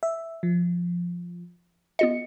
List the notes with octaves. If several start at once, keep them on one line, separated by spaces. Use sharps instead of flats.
E5
F3
B3 F4 D#5 C#7